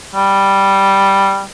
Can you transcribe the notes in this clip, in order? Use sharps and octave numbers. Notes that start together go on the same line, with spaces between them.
G3